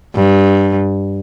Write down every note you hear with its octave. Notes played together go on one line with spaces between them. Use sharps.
G2